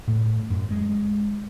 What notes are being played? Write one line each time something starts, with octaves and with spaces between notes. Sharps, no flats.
A2
F#2
G#3